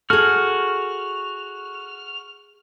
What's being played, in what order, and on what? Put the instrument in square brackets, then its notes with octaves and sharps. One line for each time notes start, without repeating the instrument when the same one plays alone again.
[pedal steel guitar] F#4 F6 [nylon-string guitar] G#4 A4